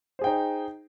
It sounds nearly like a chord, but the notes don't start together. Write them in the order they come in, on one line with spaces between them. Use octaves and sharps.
C5 G#4 G5 D#4